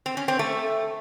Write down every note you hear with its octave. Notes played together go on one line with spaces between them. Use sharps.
C4
C#4
C4
A3